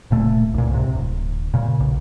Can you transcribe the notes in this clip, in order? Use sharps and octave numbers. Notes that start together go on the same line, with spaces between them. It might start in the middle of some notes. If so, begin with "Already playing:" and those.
D1 A#2 A3
C2 A#2
G#2 C3
D1
A#2 C#3
B1